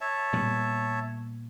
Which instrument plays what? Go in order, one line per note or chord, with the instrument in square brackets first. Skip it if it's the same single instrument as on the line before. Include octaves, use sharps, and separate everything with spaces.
[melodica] C#5 E5 A5
[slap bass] A#2 G3 B3